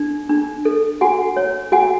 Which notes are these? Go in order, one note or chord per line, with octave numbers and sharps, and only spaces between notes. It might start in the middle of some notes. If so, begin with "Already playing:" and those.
Already playing: D4
D4
A4
F#4 F#5 G#5
C#5
F#4 F#5 G#5